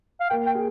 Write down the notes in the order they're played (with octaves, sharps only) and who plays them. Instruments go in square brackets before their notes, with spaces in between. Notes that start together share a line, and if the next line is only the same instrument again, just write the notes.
[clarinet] F5
[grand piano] A#3 [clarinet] G5
[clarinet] G5
[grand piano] G#4